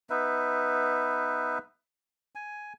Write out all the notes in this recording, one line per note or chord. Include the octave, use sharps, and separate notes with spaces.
B3 D#4 B4 E5
G#5